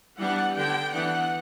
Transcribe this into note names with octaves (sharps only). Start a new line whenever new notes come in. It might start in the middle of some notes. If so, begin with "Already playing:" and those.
E3 G3 B3 D4 F#5
D3 G3 B3 D4 G5
E3 B3 D4 F#5